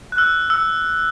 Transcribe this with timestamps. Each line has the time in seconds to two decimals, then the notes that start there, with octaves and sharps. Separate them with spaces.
0.12 F#6
0.18 E6
0.50 E6